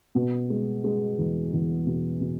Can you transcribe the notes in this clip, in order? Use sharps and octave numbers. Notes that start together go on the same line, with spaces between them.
B2
G#3
G#3
E2
E2
B2
B2